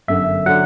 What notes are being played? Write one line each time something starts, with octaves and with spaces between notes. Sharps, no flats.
G1 F#2 D3 E5
D3 F#3 F#5